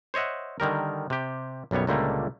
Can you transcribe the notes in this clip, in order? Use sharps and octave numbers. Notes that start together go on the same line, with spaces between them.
C5 C#5 D#5 E5 F#5
D3 D#3 G3 A#4
C3 G4
B1 F#2 G3 B3 C#5
C#2 A#2 D3 G3 A3 A#3